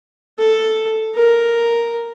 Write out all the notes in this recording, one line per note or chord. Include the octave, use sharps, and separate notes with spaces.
A4
A#4